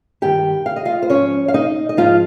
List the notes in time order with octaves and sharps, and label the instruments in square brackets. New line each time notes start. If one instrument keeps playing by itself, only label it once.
[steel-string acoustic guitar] G2 D#3 G4 G5
F5
D#5
F4 F5
C5
G#2 F3 C#4 C#5
F5
D#4 D#5
D#5
G#2 F3 F4 F5